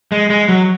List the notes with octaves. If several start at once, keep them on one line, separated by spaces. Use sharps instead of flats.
G#3
G#3
F#3